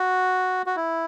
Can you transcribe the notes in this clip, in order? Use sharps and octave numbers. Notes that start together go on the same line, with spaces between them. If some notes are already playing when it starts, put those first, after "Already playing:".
Already playing: F#4
F#4
E4